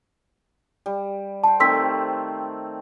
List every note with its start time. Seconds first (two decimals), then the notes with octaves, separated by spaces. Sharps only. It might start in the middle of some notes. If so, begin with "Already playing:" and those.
0.86 G3
1.44 C5 G5 A5
1.60 D#3 A3 C4 C6 E6 B6